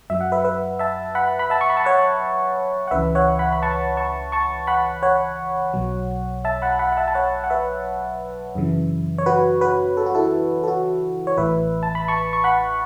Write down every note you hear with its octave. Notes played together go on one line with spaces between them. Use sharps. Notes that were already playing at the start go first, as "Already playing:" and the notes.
F#2 F#3 E5
F#5
B4 E5
B4 E5
E5 A5
F#5 B5
B5
E5 A5
C#6
B5
A5
C#5 F#5
F#5
C#2 C#3 E3 B4 E5
C#5 F#5
F#5 B5
B5
A5 C#6
A5 C#6
A5 C#6
F#5 B5
C#5 F#5
B1 B2 F#3
E5 A5
F#5 B5
F#5 B5
F#5
E5 A5
A5
C#5 F#5
F#5
B4 E5
F#2 C#3 E3
C#5
F#4 B4
F#4 B4
A4
F#4
E4 A4
A4
F#4
C#5
A1 A2 E3 B4 E5
A5
B5
A5 C#6
C#6
F#5 B5